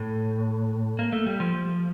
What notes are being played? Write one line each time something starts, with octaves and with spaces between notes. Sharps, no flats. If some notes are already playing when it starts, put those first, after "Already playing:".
Already playing: A2
A#3
A3
G3
F3